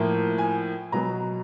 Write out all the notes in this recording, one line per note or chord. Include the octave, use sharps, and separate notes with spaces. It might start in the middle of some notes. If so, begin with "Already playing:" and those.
Already playing: A2 F3 A#3
G#5
B2 F#3 B3 A#5